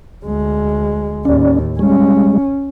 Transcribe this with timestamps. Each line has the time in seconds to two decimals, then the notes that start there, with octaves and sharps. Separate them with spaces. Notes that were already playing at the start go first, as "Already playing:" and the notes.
0.25 D2 G#3
1.25 D#2 A2 C#4 D5
1.79 G3 G#3 C#4